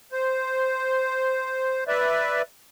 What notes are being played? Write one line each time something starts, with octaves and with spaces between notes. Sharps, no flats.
C5
B4 D5 E5